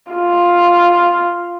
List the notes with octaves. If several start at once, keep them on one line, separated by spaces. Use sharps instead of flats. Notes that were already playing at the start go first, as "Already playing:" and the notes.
F4